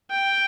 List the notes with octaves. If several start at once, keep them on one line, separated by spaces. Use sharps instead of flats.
G5